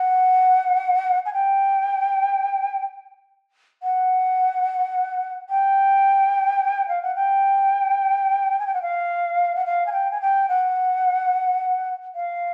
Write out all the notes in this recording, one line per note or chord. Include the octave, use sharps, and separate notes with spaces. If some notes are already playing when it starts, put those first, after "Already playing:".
Already playing: F#5
G#5
G5
F#5
G5
F5
F#5
G5
G#5
G5
F#5
F5
F#5
F5
G#5
G5
G#5
G5
F#5
F5